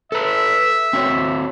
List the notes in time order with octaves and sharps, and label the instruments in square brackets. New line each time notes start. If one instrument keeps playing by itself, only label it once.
[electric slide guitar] A4 B4 [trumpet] E5
[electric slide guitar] C4 F#4 C#5